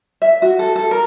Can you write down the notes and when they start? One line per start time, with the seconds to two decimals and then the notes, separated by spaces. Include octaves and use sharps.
0.22 E5
0.42 F#4
0.59 A4
0.76 A4
0.91 A#4